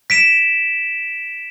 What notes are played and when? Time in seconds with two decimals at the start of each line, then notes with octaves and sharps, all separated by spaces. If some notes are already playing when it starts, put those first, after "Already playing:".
0.10 B6 D7 E7